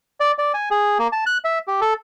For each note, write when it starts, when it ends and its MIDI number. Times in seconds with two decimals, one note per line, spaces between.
0.20 0.32 74
0.38 0.52 74
0.54 0.69 80
0.71 0.98 68
0.99 1.08 58
1.12 1.24 81
1.26 1.38 90
1.44 1.59 76
1.67 1.80 67
1.81 1.94 69